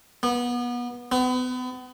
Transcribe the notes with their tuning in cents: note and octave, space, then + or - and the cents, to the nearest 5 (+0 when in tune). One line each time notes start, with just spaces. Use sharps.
B3 -25
B3 +35